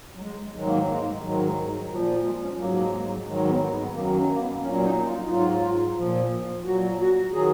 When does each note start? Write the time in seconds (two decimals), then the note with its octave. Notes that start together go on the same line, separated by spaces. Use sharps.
0.15 F#3
0.21 G#3
0.55 G#2 D#3 F#3 G#3
0.66 A#3
0.76 G#3
0.89 G#3
1.23 G#2 D#3 F#3
1.46 G#3
1.68 F#3
1.91 A#2 F3 F#3
2.08 F#3
2.25 G#3
2.42 C#4
2.58 G#2 F#3 A#3
2.72 A#3
2.81 G#3
3.04 F#3
3.26 G#2 D#3 F#3 G#3
3.48 B3
3.71 B3
3.94 F#2 D#3 F#3 A#3
4.31 A#3
4.39 B3
4.62 A#2 F#3 C#4
4.84 D#4
5.06 F4
5.24 D#4
5.29 G#2 F#3 F4
5.97 A#2 F3
6.65 A#2 F#3 F#4
6.99 F#4
7.33 D#3 F#3 G#4